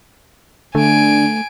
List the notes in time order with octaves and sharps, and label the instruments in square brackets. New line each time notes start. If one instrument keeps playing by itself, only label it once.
[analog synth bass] D3 [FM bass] A3 [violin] G#5 D7